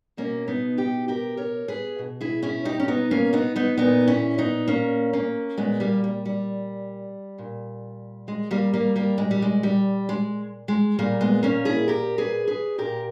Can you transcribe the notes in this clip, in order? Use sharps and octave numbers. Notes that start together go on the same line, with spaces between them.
B2 A#3 C#4
B3 D#4
D#4 G4
G4 A#4
A#4 C#5
G#4 B4
B2
E4 G#4
C#4 E4
D#4 G4
C#4
B3 D#4
A#3 C#4
B3 D#4
B3 D#4
A#2 B3 D#4
C#4 E4
B3 D#4
A#3 C#4
A#3 C#4
A#2 G#3 B3
G3 A#3
G3
G3
A#2
G#3
G3 A#3
G3 A#3
G3 A#3
A#2 G#3
G3
G#3
G3
G#3
G#3
A#2 G3 A#3
G#3 B3
A#3 C#4
E4 G#4
G4 A#4
G#4 B4
G#4 B4
A#2 G4 A#4